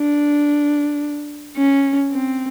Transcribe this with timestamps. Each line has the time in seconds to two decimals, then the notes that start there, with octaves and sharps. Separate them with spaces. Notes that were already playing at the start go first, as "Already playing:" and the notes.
Already playing: D4
1.57 C#4
2.12 C4